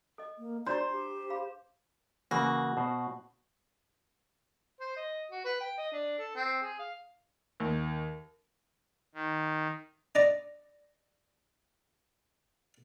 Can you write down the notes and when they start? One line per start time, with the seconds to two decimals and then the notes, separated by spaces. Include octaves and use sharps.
0.18 A4 D#5
0.38 A#3
0.66 D4 F#4 C5 D5 A#5
0.91 G4
1.30 G#4 F5 B5
2.31 C#3 E3 A#3 F#4
2.77 B2 C5
4.80 C5
4.96 D#5
5.31 F#4
5.45 B4
5.61 G5
5.78 D#5
5.92 D4
6.19 A4
6.36 C4
6.62 G#4
6.79 F5
7.60 D#2
9.14 D#3
10.15 D4 D5 D#5 A#5